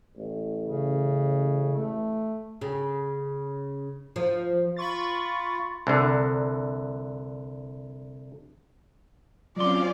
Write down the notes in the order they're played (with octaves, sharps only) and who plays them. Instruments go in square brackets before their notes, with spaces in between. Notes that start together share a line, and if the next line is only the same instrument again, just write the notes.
[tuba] A1
[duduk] C#3
A3
[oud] C#3
F3
[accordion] F4 [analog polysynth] B5 C#6 A6
[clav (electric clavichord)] C2 D3
[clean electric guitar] F#3 C6 [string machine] C4 C#4 F5 [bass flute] F4 [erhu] D5